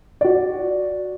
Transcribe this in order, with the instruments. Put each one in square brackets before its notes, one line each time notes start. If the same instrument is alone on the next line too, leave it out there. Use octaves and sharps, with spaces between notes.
[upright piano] F#4 D5